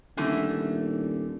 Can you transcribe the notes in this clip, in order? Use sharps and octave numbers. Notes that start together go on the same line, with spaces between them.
D#1 D3 E3 A3